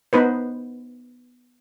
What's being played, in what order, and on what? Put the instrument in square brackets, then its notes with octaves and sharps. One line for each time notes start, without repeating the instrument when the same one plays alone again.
[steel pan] B3 D#4 B4 C5